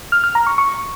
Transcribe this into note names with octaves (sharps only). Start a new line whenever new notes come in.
F6
F6
A#5
C#6
C#6